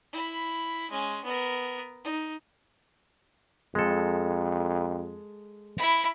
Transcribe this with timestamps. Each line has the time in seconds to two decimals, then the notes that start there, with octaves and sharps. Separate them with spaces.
0.13 E4 B5
0.91 G#3 C#4
1.24 B3 A#4
2.04 D#4
3.75 F2 G#3 A4
5.77 E4 B5